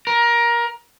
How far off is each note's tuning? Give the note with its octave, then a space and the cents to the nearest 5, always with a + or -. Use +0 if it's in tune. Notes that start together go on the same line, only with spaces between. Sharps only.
A#4 +20